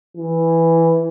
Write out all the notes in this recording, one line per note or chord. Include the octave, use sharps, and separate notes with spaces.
E3